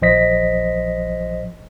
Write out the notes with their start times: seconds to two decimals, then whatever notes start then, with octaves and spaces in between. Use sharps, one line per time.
0.02 A#1 F3 C5 D#5 A#6 B6